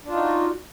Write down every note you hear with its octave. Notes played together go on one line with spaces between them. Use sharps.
D4 D#4 F4 F#4